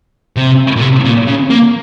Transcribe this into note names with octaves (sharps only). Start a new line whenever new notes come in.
C3
A#2
C3
A#2
C#3
A#3